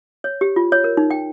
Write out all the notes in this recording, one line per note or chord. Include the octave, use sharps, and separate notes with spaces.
C#5
G4
F4
C#5
A#4
D#4
G5